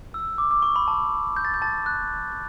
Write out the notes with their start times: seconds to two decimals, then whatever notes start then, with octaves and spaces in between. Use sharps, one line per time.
0.14 E6
0.38 D6
0.51 D6
0.62 C#6
0.76 B5
0.88 A5
1.36 G6
1.45 A6
1.54 G6
1.62 A5 A6
1.86 F#6